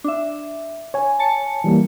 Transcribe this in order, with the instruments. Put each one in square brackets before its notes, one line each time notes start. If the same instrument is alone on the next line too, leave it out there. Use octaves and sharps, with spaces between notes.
[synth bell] D4 E5
[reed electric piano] C#5 G#5
[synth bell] A5 C#7
[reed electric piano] E3 G3 A#3